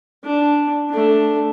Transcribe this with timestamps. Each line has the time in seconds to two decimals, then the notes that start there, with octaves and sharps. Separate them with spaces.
0.24 D4
0.90 A3 D4